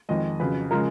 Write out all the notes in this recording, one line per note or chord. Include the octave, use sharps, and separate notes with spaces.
F2 D#3 G#3 D#5
F2 C#3 F#3 B4
C#3 F3 G#3 A#4